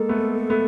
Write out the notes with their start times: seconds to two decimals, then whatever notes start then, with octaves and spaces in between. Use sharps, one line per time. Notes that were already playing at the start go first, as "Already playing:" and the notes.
Already playing: G#3 A#3 A4
0.09 A3 B3
0.50 A3 B3